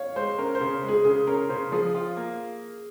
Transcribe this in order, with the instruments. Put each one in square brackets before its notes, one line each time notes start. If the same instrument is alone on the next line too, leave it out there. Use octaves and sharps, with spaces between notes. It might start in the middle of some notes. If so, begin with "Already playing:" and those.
Already playing: [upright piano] C#5 F5
[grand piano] G#3 [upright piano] C5
[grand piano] C#4 [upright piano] A#4
[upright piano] C5
[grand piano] C#3
G#3
[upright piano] G#4
[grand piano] C#3 [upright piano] G#4
[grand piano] C#4 [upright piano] A#4
[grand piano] C#3 [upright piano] C5
[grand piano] F3 [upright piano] G#4
[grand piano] F4
A#3